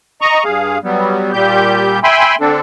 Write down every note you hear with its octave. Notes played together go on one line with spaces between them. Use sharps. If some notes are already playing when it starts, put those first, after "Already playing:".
D#5 A#5 C#6
G2 G#4 F5
F#3 G3 B3
A#2 G3 G4 G6
E5 G5 G#5 B5 C6
D3 C4 D4 A4